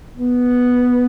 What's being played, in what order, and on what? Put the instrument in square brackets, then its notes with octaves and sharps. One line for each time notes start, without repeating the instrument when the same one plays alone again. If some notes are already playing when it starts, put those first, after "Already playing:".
[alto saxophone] B3